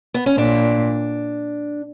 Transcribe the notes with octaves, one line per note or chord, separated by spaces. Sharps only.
B3
C#4
A#2 D4